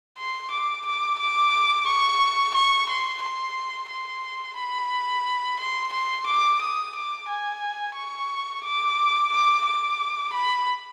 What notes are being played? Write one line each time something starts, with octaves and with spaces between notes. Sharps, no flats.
C6
D6
D6
D6
C#6
C#6
C6
C6
C6
B5
C6
C6
D6
D#6
D6
G#5
C#6
D6
D6
D6
B5